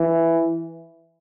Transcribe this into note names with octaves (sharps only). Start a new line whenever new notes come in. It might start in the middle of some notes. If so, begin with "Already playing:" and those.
Already playing: E3